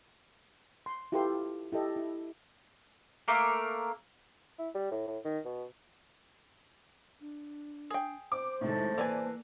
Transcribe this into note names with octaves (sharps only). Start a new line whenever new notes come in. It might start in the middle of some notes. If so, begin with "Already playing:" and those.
C6
E4 F4 G4 A4 B4 C6
E4 G4 A4 D#5
E4
A3 A#3 A#4
E4
G3
A2
A2
D#3
B2
D4
G#4 G5
C5 D6
A2 C3 D#3 G#3 A4
E3 A#3 B4 D5 G#5 A5